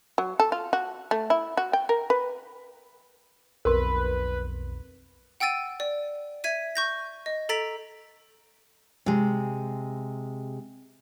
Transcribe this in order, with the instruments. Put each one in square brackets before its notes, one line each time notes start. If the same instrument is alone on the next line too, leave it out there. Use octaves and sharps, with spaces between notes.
[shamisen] F#3
A4
F4
F#4
A3
E4
F#4
G5
A#4
B4
[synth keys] B1 F2 [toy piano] A#4 C6 [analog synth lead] B4
[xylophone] F#5 G5 E6 A6 D#7
D5
E5 G#6 B6 D#7
C#6 G6 A#6
D#5
A4 A#5 A6 B6 D7 F7
[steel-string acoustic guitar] C3 G#3